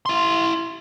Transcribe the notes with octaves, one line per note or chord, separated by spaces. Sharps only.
E4 C6